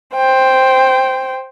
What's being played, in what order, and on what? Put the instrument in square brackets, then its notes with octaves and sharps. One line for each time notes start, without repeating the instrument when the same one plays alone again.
[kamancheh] C5 G5